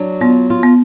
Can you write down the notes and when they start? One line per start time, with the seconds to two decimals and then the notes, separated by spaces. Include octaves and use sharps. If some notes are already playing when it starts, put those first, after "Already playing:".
Already playing: F#3 D4
0.21 B3 F4
0.50 F4
0.63 B3